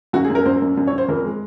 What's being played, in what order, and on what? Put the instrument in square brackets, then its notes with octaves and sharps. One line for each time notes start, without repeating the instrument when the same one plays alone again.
[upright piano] F#2 F#4
G#4
F#2
A#4
F#2 C5
F#2
F#2
C#5
F#2
C5
F2 A#4
G#3